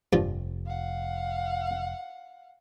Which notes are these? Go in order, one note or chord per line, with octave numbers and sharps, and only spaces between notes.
F1 G2 F3
F5 F#5